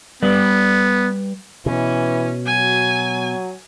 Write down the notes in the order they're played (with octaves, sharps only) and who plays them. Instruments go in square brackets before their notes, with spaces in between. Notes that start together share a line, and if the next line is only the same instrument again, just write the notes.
[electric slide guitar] G3 B4 D5 [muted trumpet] B3
[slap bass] B2 [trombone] E3 [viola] C#4
[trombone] F#3 [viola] G#5